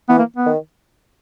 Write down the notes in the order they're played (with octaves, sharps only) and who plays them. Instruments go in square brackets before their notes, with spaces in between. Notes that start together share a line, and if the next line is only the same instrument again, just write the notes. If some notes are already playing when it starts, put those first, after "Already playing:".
[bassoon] E3 [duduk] B3
[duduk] A#3
B3
[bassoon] D#3